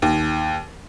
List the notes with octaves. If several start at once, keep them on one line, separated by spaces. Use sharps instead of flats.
D#2